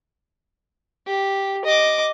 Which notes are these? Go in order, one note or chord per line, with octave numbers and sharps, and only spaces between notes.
G4
D#5 D6